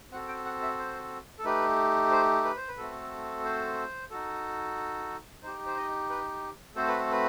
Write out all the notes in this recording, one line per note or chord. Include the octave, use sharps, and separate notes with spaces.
C4 F#4 A4 F#5
G5
F#5
E5
C5
A4
A3 D#4 G4 B4
C5
B4
C5
B4
A3 C4 F#4 A4
C5
D#4 F#4 A4
D#4 G4 C5
C5
D#5
B4
A3 C4 F#4 A4 C5
B4
A4
B4